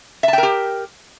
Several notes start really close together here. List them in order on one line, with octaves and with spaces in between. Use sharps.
E5 A5 G5 A#4 G4